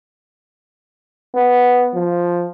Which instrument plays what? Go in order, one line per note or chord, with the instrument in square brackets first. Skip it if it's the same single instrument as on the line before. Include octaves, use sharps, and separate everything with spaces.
[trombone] B3
F3